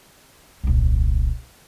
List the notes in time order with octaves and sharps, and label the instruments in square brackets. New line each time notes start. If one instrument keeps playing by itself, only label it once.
[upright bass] D#1 C2